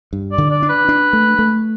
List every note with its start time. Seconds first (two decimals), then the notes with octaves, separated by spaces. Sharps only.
0.13 G2
0.32 D5
0.38 D3
0.50 D5
0.62 D4
0.69 B4
0.89 D4
1.13 A3
1.39 A3